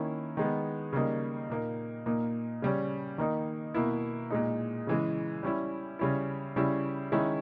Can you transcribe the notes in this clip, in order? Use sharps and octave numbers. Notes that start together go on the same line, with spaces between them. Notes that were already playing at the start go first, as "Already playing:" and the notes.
Already playing: D#3 A#3 C#4 E4
D#3 G#3 B3
C#3 G3 A#3 D#4
A#2 A#3 D#4
A#2 A#3 D#4
C#3 G3 C#4
D#3 A#3 D#4
B2 A#3 E4
A#2 G#3 D#4
C#3 E3 G#3
G3 C#4 E4
C#3 G3 C#4 E4
C#3 G3 C#4 E4
D#3 G#3 C#4 E4